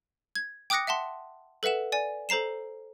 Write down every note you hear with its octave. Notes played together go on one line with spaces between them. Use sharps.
G#6
G5 D6 D#6 F#6 A#6 C#7
E5 F#5 A5 C6
A4 B4 E5 F#5 E7
D5 G#5
A4 C5 A#5 C7 E7